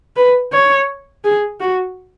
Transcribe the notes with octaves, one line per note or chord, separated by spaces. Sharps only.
B4
C#5
G#4
F#4